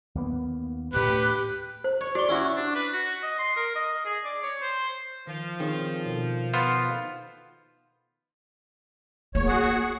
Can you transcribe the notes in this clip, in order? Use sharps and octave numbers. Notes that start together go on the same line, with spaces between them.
D#2 A#3 B3
D2 A2 G4 B4 F#6
C5
C#5
F#4 D5 C6
C#4 E4 F#4 G4
D4
B4
F#4
D#5
C6
A#4
D#5
G#4
D5
C#5
C5
D#3 F3
D#3 C4 G#4 C#5
B2 A4
B3 F4 C5
E2 A#3 C#5
F#4 G#4 F#5